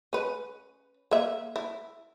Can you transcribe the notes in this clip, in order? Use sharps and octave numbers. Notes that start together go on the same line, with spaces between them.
C#4 B4
A#3 E5
E4